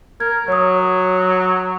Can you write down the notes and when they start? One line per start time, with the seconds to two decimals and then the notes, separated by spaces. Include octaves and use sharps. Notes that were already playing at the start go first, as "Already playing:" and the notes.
0.20 A#4 G#6
0.48 F#3 C#5 D#6